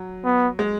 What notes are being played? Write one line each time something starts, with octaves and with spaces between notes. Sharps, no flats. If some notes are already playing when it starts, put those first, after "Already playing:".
Already playing: F#3
B3
G#3